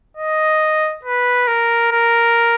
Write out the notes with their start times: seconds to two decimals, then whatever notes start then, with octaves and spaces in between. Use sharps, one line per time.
0.17 D#5
1.05 B4
1.47 A#4
1.92 A#4